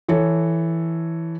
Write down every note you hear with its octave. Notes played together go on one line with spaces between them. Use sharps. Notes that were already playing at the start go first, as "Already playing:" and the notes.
E3 A4 C#5